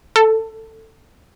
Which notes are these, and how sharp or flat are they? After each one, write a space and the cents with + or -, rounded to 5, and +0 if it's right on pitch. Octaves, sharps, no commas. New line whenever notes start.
A4 +15